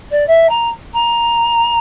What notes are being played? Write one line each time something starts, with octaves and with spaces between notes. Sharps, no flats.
D5
E5
A#5
A#5